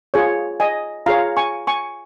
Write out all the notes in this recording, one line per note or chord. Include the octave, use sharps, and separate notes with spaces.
F4 G#4 C#5
D#5 G#5
F4 G#4 C#5 F5 A#5
G#5 C#6
G#5 C#6